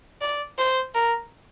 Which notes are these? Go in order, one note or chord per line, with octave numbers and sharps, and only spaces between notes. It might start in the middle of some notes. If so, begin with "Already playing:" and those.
D5
C5
A#4